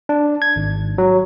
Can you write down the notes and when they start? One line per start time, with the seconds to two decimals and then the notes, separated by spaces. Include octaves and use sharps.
0.09 D4
0.42 G#6
0.56 G#1
0.98 F#3